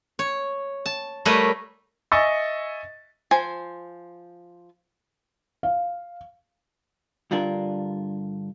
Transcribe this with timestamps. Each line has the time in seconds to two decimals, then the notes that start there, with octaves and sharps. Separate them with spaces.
0.19 C#5
0.86 A5
1.25 G3 A3 A#4 B4 C#5 D#5
2.12 D#5 E5 G#5 C#6 E6 A6
3.31 F3 C5 G#5
5.63 F5
7.31 G2 D3 D4 F4 A#4